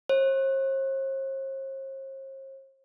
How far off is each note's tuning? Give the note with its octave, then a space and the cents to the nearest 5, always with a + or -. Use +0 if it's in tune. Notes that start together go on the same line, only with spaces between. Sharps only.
C5 +45